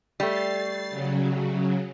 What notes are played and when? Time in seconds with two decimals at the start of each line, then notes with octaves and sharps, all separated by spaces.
0.20 G3 A3 A6 C7
0.90 C#3 F#3